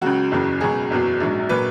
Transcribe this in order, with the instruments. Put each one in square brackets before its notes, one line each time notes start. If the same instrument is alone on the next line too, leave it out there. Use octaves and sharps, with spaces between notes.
[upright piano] C#2 C#3 F#3 F#4
F#1 E2 C#3 F#3
C#2 B2 F#3 G#4
F#1 E2 B2 F#3
A#1 G#2 F#3
A#2 F#3 B4